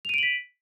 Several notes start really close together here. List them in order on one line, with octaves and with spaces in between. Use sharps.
F7 D#7 D7 F#7 B6